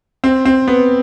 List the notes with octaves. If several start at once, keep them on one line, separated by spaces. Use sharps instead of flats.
C4
C4
B3